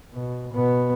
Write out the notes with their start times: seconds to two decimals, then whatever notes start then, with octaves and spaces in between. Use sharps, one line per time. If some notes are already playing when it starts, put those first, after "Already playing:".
0.14 B2
0.53 B2 B3